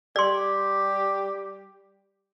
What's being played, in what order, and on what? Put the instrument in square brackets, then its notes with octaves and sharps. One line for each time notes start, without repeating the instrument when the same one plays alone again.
[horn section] G3 G4 [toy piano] D5 C6